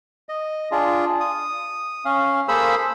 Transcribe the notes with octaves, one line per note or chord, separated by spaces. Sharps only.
D#5
D4 F4 G#4
D#6
C#4 F5
A#3 G#4 A4 C5 B5 E6